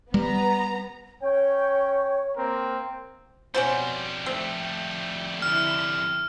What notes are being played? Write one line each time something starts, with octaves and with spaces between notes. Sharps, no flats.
G3 B3 A#5
C#4 C#5 G5
A#3 C4 A#4
F2 B2 G3 C#4 F#4 C5
A3 C4
D3 E4 F6